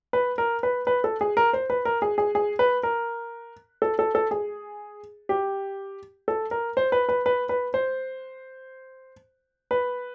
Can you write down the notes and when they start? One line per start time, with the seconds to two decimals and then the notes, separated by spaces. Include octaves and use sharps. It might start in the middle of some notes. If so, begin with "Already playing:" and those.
0.13 B4
0.38 A#4
0.63 B4
0.87 B4
1.04 A4
1.21 G#4
1.37 A#4
1.53 C5
1.70 B4
1.85 A#4
2.02 G#4
2.18 G#4
2.35 G#4
2.59 B4
2.83 A#4
3.82 A4
3.99 A4
4.15 A4
4.31 G#4
5.29 G4
6.28 A4
6.51 A#4
6.77 C5
6.92 B4
7.09 B4
7.26 B4
7.49 B4
7.74 C5
9.71 B4